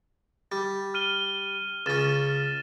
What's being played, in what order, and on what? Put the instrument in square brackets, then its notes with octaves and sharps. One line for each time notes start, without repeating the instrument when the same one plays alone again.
[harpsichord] G3
[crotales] F6 D#7 G7
[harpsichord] C#2 C#4 [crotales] A6 E7